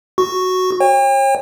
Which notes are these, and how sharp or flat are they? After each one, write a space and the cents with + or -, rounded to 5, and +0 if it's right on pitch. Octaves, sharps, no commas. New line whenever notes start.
F#4 +0 C#6 +0
C#5 -35 G5 +40